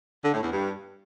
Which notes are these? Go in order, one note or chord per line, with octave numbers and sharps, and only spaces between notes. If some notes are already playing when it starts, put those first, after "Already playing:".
D3
A2
E2
G2